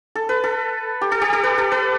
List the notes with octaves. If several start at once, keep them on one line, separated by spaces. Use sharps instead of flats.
A4
B4
A4
G4
A4
G4
A4
B4
A4
B4